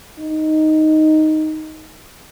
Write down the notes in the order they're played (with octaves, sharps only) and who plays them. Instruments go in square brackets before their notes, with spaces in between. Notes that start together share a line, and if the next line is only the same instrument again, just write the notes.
[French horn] D#4